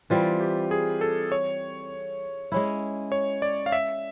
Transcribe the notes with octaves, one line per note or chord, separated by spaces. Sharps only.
E3 G3 C4 F4
G4
G#4
A4
C#5
G#3 C#4 E4
C#5
D5
F5
E5